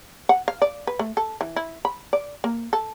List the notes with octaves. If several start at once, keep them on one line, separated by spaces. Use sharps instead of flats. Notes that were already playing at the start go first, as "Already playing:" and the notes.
F#5
F5
D5
B4
A3
A4
E3
E4
B5
D5
A#3
A4